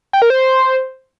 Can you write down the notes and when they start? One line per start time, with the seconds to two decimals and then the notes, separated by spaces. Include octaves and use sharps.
0.13 G5
0.22 A#4
0.30 C5